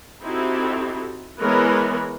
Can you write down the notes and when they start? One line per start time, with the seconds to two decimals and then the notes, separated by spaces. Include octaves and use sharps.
0.22 C4 D#4 E4 F#4 G4 A4
1.39 E3 G#3 B3 A#4 B4 C#5